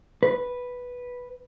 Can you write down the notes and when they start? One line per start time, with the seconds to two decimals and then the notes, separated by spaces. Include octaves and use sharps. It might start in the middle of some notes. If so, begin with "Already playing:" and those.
0.23 B4